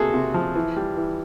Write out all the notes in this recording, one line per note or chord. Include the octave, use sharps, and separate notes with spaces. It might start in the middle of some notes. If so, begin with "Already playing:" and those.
Already playing: C3 A#3 F#4 G#4 A4
C3
F3
E3
G3
E3